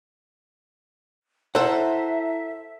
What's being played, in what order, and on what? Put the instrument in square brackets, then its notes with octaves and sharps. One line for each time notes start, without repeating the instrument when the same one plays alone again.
[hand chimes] E4 A5 A#5 [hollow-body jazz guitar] A4 F#5 [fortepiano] C5 [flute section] E5